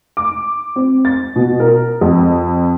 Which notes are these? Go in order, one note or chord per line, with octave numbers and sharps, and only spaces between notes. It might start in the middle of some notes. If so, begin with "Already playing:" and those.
D6
C4
A6
B2
A#4
F2